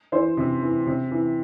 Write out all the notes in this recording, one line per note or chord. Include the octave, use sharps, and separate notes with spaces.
E3 C5
C3
E3
C3
E3